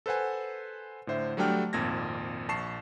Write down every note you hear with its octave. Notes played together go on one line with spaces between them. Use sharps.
A4 B4 C5 F#5 G#5
A2 D3 C5 E5
F#3 G3 A3 D4 G5 F6
G#1 F2 A#2 G#6 A#6
A#1 A5 C#6 C7 E7